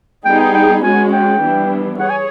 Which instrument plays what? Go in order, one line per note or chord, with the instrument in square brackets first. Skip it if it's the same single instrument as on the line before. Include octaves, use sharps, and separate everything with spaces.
[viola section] G3 B3 D#4 G#4 [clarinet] G5
[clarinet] G5
G5
[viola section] G#3 C#4 F#4 [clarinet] G#5
[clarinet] G5
[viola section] E3 G3 B3 D4
[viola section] G#4 C#5 [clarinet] F#5
[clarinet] G#5